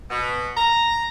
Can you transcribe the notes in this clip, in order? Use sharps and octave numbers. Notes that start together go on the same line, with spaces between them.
B2
A#5